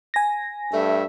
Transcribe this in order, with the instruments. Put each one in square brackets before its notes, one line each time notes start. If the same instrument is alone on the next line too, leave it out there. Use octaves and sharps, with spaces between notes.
[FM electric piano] G#5 A#6
[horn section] G2 A3 E5